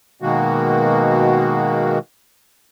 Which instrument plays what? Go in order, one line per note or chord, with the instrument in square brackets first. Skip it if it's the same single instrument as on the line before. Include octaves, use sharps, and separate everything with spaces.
[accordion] B2 D#3 G#3 A#3 F#4